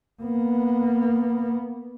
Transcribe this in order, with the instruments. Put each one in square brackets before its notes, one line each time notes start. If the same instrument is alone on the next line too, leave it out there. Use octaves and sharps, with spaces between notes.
[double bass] A#3 B3